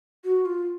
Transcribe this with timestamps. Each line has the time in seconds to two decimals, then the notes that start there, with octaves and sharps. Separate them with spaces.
0.24 F#4
0.45 F4